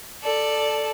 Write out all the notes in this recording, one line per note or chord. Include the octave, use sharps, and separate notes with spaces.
A4 D5